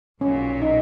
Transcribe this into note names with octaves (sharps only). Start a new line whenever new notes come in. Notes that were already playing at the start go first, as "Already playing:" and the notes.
B1 A#2 F#3 C#4
D#4